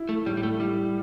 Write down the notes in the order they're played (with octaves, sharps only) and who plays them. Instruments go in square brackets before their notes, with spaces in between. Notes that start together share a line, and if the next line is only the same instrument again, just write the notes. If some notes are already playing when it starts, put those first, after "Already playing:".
Already playing: [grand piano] E4
[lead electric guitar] A3
[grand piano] A2 [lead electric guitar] G3
[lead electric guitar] G3
A3
[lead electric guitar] G3 [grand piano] E4